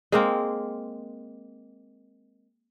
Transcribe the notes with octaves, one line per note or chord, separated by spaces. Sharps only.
G#3 A#3 C4